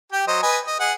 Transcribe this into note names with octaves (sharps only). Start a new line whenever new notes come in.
G4 G5
F#3 C5 D#5
B4 D#5 G#5
D#5
G#4 F#5